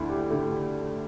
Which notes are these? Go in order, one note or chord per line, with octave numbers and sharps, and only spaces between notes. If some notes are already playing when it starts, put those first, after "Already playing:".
Already playing: D2 D3 A3 D4 E4
G4
D3 A3 G4